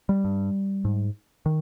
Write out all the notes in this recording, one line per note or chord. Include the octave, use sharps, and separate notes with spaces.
G3
G2
G#2
D#3